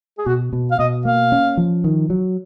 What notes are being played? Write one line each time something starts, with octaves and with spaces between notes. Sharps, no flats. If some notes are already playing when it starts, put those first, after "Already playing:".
G#4
B2 F#4
B2
F5
B2 D#5
A#3 F5
C#4
F3
D#3
F#3